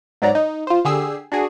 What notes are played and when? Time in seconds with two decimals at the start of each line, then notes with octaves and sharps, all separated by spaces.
0.22 G#2 F#3 D5 A#5
0.35 D#4
0.67 F4 C5
0.85 D3 G4 G#4 E6 C7
1.32 D4 F#4 G#4